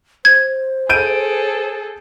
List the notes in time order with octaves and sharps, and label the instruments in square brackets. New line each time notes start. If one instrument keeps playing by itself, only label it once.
[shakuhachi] C5 [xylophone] G#6
[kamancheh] G#4 A4 [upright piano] G6 D7 D#7